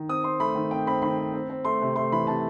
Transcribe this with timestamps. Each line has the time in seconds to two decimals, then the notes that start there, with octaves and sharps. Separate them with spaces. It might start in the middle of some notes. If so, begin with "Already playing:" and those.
Already playing: D#3
0.09 C4 D#6
0.24 C4 C6
0.40 A3 B5
0.55 D#3
0.71 C4 G5
0.87 C4 B5
1.02 D#3 B5
1.18 C4
1.33 C4
1.50 C4
1.65 A3 C6
1.81 C3
1.96 A3 C6
2.12 E3 B5
2.27 C3 A5